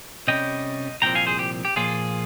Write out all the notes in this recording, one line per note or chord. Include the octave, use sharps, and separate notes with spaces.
C3 G3 C#4 D#5 G5
C2 A#2 F3 C4 G5 A#5
F5 G#5
G#4 C5
G4
G4
A#2 F3 A#3 F4 G#4